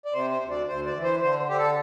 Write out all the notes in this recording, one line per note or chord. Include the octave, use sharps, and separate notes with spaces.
D5
C3 C5
C5
D2
D5
D2 C5
D5
E3
C5
D3 C5
D3 G4
A4